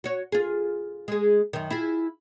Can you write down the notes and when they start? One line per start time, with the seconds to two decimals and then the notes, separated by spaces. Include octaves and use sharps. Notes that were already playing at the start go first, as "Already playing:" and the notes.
0.04 F#4 C#5
0.32 F4 G#4
1.08 G#3 G#4
1.53 F#2 D#3
1.70 E4 F4 G#4